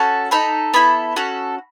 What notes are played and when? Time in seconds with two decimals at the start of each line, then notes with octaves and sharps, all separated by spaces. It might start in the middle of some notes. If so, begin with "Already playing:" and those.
Already playing: C#4 F#4 A4 A5
0.31 D#4 A4 B5
0.74 B3 E4 A4 B5
1.16 C#4 F#4 A4